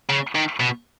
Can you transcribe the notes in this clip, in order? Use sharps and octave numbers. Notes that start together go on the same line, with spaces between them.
C#3
D#3
B2